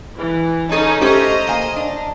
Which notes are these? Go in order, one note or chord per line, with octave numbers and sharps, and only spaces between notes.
E3
C#4 D#4 G#4 A4 D#5
A3 C#4 G4 C5 D#5 A#5
A#3 G#5
D4